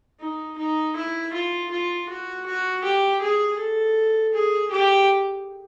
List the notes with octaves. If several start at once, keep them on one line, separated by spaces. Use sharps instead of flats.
D#4
D#4
E4
F4
F4
F#4
F#4
G4
G#4
A4
G#4
G4